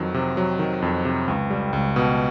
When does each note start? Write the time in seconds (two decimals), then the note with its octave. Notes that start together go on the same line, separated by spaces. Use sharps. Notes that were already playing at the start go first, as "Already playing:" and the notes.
Already playing: F2 D#3 F#3
0.14 C3
0.37 F#3
0.59 D#3
0.82 F2
1.05 C3
1.28 C#2
1.50 G3
1.73 C#2
1.96 B2